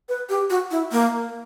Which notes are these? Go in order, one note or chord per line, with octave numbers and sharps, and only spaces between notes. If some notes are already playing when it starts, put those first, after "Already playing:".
B4
G4
F#4
E4
A#3